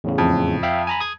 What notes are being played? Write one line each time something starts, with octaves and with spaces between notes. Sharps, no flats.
E2 A2 C#3
F2
E5 F5 G5
G#5 A#5 B5
D#6 G#6